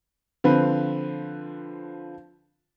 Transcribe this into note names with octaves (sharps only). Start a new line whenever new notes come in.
D3 F3 C4 B4